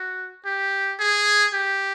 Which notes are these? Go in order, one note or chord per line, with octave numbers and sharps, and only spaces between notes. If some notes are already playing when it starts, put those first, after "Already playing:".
Already playing: F#4
G4
G#4
G4